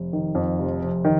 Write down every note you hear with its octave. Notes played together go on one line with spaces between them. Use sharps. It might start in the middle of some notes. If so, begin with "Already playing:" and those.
Already playing: F1
D#3
F2
F1
F1
D#3